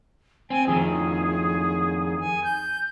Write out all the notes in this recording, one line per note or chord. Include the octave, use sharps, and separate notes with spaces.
C4 G#5
F2 D#3 G#4
G#5
G6